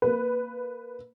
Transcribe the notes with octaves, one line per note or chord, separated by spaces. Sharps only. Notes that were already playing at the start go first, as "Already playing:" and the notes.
A#3 B4